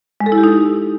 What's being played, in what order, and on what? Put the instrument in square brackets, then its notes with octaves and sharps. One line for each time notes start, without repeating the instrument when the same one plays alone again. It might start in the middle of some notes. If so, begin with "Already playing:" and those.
[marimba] G#3
A4
E4
G4
D#4